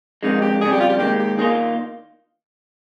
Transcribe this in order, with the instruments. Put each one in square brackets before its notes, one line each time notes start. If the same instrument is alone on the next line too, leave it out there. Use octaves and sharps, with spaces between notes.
[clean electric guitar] F2 D#3 G#3 [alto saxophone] D#4
[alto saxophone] G4
[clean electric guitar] F2 C#3 G3 [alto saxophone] G#4
[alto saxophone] G4
F4
G4
[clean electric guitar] D#2 D#3 G#3 [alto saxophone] G4
[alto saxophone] G4
[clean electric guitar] D#3 A#3 F4 [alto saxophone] G#4